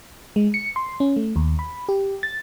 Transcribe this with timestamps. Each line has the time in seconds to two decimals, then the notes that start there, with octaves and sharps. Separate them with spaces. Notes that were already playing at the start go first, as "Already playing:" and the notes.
0.36 G#3
0.54 C#7
0.76 C6
1.00 C#4
1.17 A3
1.36 D#2
1.59 B5
1.89 G4
2.23 A6